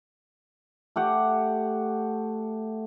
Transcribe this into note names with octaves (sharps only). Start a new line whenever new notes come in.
A3 G4 F#5